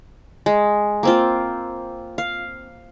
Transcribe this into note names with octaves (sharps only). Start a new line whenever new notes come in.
G#3
A#3 C4 F4
F5